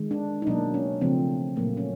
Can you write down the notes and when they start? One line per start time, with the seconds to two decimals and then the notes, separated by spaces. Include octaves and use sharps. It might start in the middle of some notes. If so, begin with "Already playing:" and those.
Already playing: D#3 G#3
0.11 D4
0.42 D#4
0.47 B2 F#3 A#3 D4
0.74 C#4
1.01 C#3 F3 A3 C4
1.56 A#2 F#3 A3 A#3
1.77 C#4